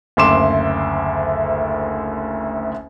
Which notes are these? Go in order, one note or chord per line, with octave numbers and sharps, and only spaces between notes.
F#1 D2 E5 C6 D6 E7